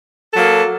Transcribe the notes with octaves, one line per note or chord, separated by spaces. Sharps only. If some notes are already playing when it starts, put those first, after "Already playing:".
F#3 A#3 A4